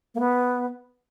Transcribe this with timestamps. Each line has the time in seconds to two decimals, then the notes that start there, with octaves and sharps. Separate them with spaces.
0.15 A#3
0.20 B3